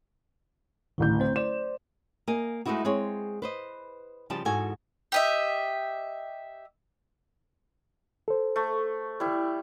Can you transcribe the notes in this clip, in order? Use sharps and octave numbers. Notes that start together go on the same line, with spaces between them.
D1 A1 A2 D#3 G6
C4 C5
C5 D5 E7
A#3 D#5 G#5
G#3 A3 B3 D#4 E4 F#4
G#3 C4 G#4 C#5
B4 C5 D#5
C#3 F3 G3 G4 A5
E2 G#2 F#4 A4 G#5
G4 D#5 E5
A4 C5
A3
G3 E4